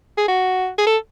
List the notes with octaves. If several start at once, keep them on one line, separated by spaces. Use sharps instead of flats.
G#4
F#4
G#4
A4